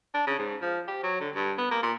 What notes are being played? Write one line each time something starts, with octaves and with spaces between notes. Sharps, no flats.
D4
C#3
G#2
F3
G4
F#3
D3
G2
B3
A#3
A#2